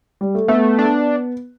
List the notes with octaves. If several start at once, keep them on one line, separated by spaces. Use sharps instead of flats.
G3
A3
A3 B3
D4